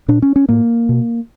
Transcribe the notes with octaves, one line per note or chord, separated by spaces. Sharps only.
A#2 D4
C#4
C#4
A2 A#3
B2